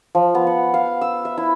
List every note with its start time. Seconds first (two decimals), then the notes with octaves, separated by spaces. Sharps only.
0.15 F3
0.35 B3
0.47 F#5
0.74 F5
1.01 E6
1.25 E5
1.38 E4